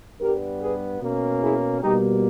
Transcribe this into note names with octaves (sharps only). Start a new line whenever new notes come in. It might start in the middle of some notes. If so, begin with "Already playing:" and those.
G2 G3 B3 G4 A#4
G#4 B4
B2 A#3 C#4
E4 G#4
B2 G3 A#3 D#4 G4